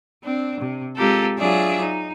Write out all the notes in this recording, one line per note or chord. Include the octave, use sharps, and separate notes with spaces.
C4 D4
C3
G#3 C4 F4 G4 A4 A#4
F#3 D4 F4 G#4 D5 E5
D#4